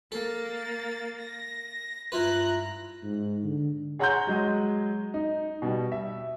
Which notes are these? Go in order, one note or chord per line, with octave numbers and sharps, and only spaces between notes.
A#3 A4 A6
A#6
G2 E4 F4 B4 A#5 F#6
G#2
D3
G#4 C#5 F#5 A#5 C6 G6
F#3 G#3 D#5
D#4
B2 G3
E5